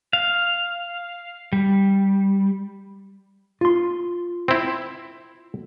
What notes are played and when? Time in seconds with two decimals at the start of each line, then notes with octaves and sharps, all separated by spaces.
0.13 F5
1.53 G3
3.61 F4 C6
4.48 C4 E4